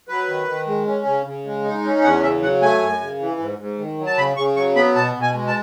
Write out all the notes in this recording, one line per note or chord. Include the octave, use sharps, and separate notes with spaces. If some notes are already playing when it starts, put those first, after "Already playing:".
F#3 B4
D#3
D#3
G#3
C#4
C#3
C#3
G#3
D#4
C#4
E2 F#5
C#3 E5
F#3 F#5
A3 G#5
F#2
C#3
E3
G#2
G#2
D#3
F#3
A5
C#3 B5
C#3 C#6
F#3 C#6
B3 B5
B2 A5
B2
G#5
G#3
A5